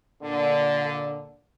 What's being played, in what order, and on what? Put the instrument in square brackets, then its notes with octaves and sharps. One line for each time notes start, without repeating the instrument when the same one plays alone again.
[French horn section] A#2 D3